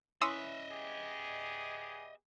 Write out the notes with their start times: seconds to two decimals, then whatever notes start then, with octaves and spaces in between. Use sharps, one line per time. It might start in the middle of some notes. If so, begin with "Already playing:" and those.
0.22 C#4 E4 B4 D#5 E5 C6 D#6 E6
0.71 B3 G4 G#4